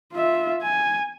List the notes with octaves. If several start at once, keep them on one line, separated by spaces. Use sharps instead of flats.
F4 E5
G#5